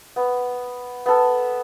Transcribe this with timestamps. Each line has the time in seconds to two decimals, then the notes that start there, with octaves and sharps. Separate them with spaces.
0.16 B3
1.06 B3 A4